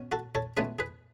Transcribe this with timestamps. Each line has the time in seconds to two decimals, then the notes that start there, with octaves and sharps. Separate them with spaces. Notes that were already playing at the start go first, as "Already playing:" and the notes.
Already playing: B2 C#4
0.12 F#4 A4
0.35 A4 C#5
0.57 C#2 B2 A3 C#4 G#4 B4
0.79 G#4 B4